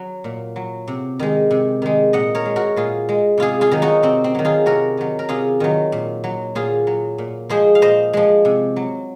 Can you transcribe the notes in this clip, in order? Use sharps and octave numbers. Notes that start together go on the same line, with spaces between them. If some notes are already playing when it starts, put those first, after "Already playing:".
Already playing: F#3
A#2
F#3
C3
D#3 G#3
C3
D#3 G#3
A#2 D#5 F#5
A#4 C#5
G#3
F#4 A#4
A#2 F4 G#4
G#3
C3 F4 G#4
F4 G#4
D#3 F#3
D#4 F#4
C3 C4
C4
D#3 F#3
F4 G#4
C3 F#4 A#4
D#3 F#3
A#4
C3 F4 G#4
D#3 F#3
A#2
F#3
A#2 F4 G#4
F#3
A#2
F3 G#3 G#4 C5
F5
A#2 C5 D#5
F3 G#3
C3
F#3